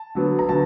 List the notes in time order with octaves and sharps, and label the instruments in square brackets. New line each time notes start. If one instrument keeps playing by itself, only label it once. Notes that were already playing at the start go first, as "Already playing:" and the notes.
Already playing: [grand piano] A5
D3 F#3 B3
A#5
D3 F#3 B3 A5